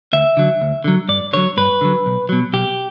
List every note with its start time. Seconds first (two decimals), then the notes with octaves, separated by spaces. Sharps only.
0.13 D2 E5
0.37 D3 F#3
0.61 D2
0.84 D3 F#3
1.08 G2 D5
1.33 D3 F#3 C#5
1.57 G2 B4
1.81 D3 F#3
2.06 B1
2.29 B2 F#3
2.53 B1 G4